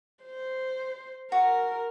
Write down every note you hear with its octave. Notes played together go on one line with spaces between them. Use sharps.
C5
F#4 A#4